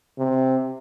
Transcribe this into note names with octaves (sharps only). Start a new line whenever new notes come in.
C3